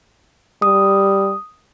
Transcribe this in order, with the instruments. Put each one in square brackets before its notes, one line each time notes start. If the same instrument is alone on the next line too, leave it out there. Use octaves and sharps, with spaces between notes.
[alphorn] G3 [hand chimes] D#6